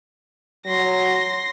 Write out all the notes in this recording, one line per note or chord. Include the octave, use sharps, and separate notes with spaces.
F#3 C6 A#6